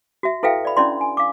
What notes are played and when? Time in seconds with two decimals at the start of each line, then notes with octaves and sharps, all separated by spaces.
0.23 F#4 E5
0.43 E4 A4 B4 E5 F5 G5
0.65 D5 B5
0.77 C#4 D4 E4 D5 C6
1.01 G#5
1.17 F5 D6